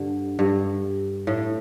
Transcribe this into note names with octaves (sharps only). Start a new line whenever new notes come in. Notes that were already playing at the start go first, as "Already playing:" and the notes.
Already playing: G2 D3
G2
A2